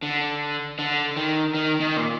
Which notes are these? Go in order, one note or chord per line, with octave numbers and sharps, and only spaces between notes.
D3
D3
D#3
D#3
D#3
A#2